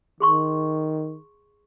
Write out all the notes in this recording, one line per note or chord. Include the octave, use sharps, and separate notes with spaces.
D#3 G#4 C6 C#6